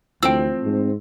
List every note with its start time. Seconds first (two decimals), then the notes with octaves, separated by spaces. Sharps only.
0.23 D2 E3 F3 A3 C4 G5 E6
0.64 G#2